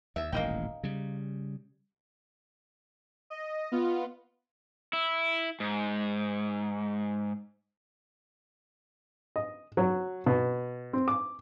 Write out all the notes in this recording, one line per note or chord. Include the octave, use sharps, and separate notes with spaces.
D#2 E5
D#1 A1 G#2 A#3 D#4 G5
C#3 G3
D#5
B3 F4
E4
G#2
D#5
F#3
B2
C4
D6